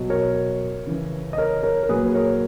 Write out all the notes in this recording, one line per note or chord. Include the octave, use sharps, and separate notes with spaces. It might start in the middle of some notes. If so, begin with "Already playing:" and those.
Already playing: B2 F#3
A#4 C#5
C#3 E3
D#5
A#4 C#5
A#4 C#5
A#4
A#2 F#3 G#4 B4
B4
A#4 C#5